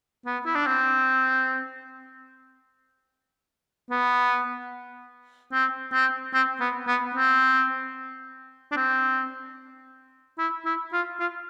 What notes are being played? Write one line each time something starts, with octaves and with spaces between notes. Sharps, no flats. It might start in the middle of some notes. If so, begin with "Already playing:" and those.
B3
E4
D4
C4
B3
C4
C4
C4
B3
B3
C4
D4
C4
E4
E4
F4
F4